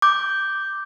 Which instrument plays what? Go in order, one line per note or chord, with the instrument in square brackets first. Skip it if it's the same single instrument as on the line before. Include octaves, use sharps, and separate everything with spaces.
[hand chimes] D6 G6